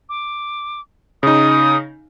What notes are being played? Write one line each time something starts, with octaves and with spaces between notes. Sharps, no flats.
D6
C#3 D#4 D#6